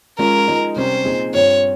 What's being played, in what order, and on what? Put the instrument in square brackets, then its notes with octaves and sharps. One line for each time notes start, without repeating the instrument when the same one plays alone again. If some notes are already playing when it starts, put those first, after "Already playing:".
[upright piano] F3 G#3 C#4 F4 [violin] A#4
[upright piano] F3 G#3 D#4
[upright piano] C3 G3 C#4 [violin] C5
[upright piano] A#2 F3 C4 D#4 G#4
[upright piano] G2 F3 C4 [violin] C#5